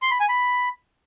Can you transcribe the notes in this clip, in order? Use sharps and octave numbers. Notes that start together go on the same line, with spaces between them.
C6
B5
G#5
B5